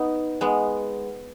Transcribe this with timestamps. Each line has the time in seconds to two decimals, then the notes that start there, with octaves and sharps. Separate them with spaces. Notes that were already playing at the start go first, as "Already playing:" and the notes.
Already playing: B3 D#4
0.41 G#3 B3